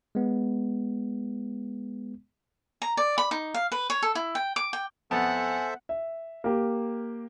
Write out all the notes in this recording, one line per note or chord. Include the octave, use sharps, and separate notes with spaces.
G#3 B3
A#5
D5
B5
D#4
F5
B4
C#5
A4
E4
G5
D6
G5
F2 B3 A4 C5 E5 F#5 G#5 A5
E5
A#3 G4